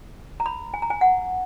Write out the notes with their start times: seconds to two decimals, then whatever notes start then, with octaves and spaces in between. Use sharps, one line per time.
0.40 A#5
0.46 B5
0.74 G#5
0.82 A#5
0.90 G#5
1.01 F#5